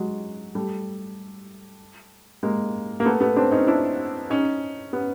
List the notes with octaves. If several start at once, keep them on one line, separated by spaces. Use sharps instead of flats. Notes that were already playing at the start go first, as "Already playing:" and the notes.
Already playing: F#3 G#3
G3 A3
G#3 A#3
A#3
A3 B3
A3 B3
C4 D4
C#4 D#4
D4 E4
C#4 D#4
B3 C#4